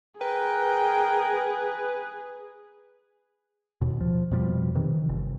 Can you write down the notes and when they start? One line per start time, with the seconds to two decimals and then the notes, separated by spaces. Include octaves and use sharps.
0.21 G#4 A#4 B4 G5
3.81 D#2 B2
4.00 F3
4.31 F2 B2 F3 G3
4.75 C3 D#3 E3
5.09 G1